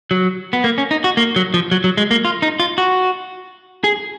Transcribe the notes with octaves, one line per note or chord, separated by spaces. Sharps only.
F#3
B3
A#3
C#4
D#4
F#4
A#3
F#3
F3
F#3
F#3
G#3
A#3
F4
D#4
F4
F#4
G#4